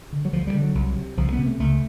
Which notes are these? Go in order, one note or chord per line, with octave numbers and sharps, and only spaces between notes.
D3
F#3
D2 F3
G3
D3
F#3
C2
C3
C2 F3
B3
C3
A3
C#2 A3